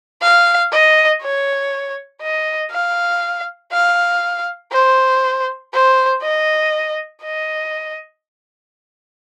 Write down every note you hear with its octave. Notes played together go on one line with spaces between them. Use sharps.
F5
D#5
C#5
D#5
F5
F5
C5
C5
D#5
D#5